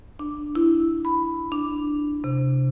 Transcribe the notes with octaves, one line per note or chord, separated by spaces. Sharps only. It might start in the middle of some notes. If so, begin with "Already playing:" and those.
D4
E4
B5
D4
C3